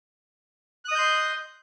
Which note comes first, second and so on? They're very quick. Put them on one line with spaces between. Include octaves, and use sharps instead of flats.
F#6 D#6 D#5 G6 C6